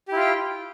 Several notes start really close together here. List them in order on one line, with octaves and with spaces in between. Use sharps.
G4 E4 F4 G5